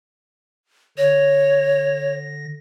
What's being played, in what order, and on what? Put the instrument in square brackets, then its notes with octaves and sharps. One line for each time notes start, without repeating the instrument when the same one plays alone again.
[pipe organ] D3 A#6 [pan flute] C#5